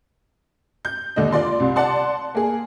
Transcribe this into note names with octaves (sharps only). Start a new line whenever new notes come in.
G6
D#2 D3 D4 D#5
F4 D5 C6
C2
D5 F#5 A5 C6
A#3 G#4